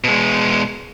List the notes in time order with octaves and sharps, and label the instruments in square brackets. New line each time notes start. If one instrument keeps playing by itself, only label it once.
[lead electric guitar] B2 G#3